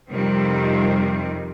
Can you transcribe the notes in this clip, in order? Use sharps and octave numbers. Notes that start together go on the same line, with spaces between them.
F2 C3 D#3 G3 C4